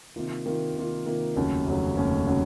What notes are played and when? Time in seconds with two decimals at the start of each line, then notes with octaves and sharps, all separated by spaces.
0.16 C3 D#3 A#3 F4
0.46 C3 D#3 A#3 F4
0.76 C3 D#3 A#3 F4
1.06 C3 D#3 A#3 F4
1.36 F1 D#2 C#3 F#3 C#4
1.67 F1 D#2 C#3 F#3 C#4
1.97 F1 D#2 C#3 F#3 C#4
2.27 C#3 F#3 C#4